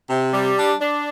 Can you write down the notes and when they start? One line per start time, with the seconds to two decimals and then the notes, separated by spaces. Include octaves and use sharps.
0.09 C3
0.33 G3
0.57 D4
0.79 D4